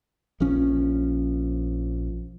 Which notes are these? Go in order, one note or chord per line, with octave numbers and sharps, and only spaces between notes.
A#1 F3 C#4